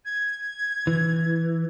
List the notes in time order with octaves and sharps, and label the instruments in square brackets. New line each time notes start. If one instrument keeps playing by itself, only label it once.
[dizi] G#6
[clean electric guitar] E3